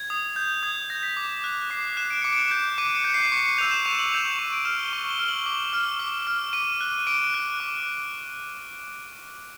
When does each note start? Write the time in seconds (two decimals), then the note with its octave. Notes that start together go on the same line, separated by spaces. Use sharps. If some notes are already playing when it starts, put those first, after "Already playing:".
Already playing: G#6
0.10 D#6
0.36 G6
0.63 D#6 G#6
0.90 G6 A#6
1.03 B6
1.17 D6
1.44 F#6
1.70 D6 C7
1.97 F#6 E7
2.10 D7
2.22 D6 C#7
2.33 D7
2.51 G6
2.78 D6 D#7
2.95 C#7
3.04 G6
3.14 C7
3.32 C#6 C#7
3.45 D#7
3.58 E6 G6 F7
3.71 E7
3.85 C#6 F7
3.99 F#7
4.11 E6 G6 F7
4.26 E7
4.38 C#6 D#7
4.52 D7
4.65 F6 E7
4.80 G7
4.93 C#6
5.10 G7
5.19 F6
5.28 F#7
5.46 D6
5.73 F6
6.00 D6
6.27 F6
6.53 D6 D#7
6.81 F#6
7.07 D6 D7
7.34 F#6
7.60 D6